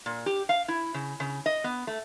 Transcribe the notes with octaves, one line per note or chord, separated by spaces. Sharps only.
A#2
G4
F5
E4
C#3
C#3
D#5
B3
A3